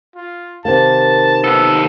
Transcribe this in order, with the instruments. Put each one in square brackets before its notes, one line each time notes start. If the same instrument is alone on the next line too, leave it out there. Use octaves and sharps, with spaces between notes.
[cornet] F4
[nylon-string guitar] C3 D#3 A#3 [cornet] A5
[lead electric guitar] D#2 A4 [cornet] B3